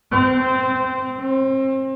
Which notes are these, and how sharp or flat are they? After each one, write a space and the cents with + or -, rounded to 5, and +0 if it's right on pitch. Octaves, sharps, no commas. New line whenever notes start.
C4 -15
C4 +35